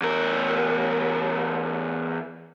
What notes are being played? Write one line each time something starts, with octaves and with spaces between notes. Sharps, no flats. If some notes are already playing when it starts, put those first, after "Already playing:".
E2 A#4